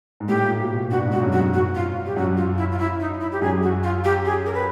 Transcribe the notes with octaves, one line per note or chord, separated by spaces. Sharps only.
G#2
A2 G4
A#2
B2
B2
G2 F#4
G#2
F#4
F#2
F#4
F#4
F4
G4
F#2 F#4
F4
E4
F4
E4
D#4
E4
G4
F#2 G#4
F#4
F4
G4
G#4
A#4
B4